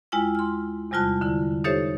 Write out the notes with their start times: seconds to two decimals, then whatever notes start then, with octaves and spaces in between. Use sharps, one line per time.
0.12 D#2 G#3 E4 F4 G5 E6
0.35 C6 F6
0.91 E2 C3 G3 F4 A5 F#6
1.21 D3 E4
1.64 D#4 G4 A4 C5 C#5 E5